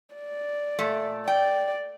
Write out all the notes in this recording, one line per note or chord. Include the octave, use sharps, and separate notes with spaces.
D5
A#2 A3
D5 G5